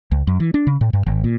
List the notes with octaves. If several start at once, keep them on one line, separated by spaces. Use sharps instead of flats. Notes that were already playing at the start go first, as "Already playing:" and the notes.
C#2
F#2
E3
D4
C#3
A2
G2
G#1
A#2